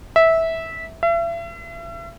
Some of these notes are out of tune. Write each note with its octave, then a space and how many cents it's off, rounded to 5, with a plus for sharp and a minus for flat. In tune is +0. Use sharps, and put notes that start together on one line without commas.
E5 -15
E5 +40